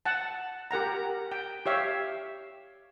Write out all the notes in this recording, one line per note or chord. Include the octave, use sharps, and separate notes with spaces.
F#5 A5
G4 A#4 F#5 A#5
G5
G4 C#5 E5 F5